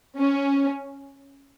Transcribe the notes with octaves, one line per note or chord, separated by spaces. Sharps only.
C#4